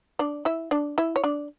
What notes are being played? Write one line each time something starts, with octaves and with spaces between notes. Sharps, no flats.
D4 D5
E4 E5
D4 D5
E4 E5
C#5
D4 D5